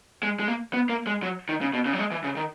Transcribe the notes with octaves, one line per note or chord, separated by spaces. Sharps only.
G#3
G#3
A#3
B3
A#3
G#3
F#3
D#3
C#3
B2
C#3
F#3
G#3
E3
C#3
D#3